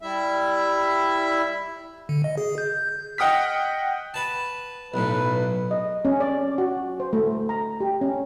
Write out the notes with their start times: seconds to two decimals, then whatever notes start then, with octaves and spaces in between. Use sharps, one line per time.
0.01 G3 E4 E5
2.09 D3
2.24 D#5
2.37 G#4
2.58 G6
2.73 G6
3.18 D#5 F#5 G5 D#6 F6 B6
4.14 B4 A5
4.94 B1 A2 B4
5.71 D#5
6.05 C#4
6.20 D5
6.58 F#4
7.00 C5
7.13 A3
7.49 A#5
7.80 G4
8.01 C#4